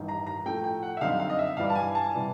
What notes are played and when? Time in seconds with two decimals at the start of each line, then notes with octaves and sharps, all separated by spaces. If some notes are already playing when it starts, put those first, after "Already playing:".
Already playing: A1 G2 D#3
0.08 A#5
0.26 A#5
0.46 A2 F3 A3 G5
0.64 G5
0.82 F#5
0.97 E5
1.01 F#2 D3 G3 C4 D#4 F5
1.20 F5
1.29 D#5
1.39 E5
1.57 G2 E3 G3 F5
1.70 A5
1.75 G#5
1.95 A5
2.13 C3 E3 G3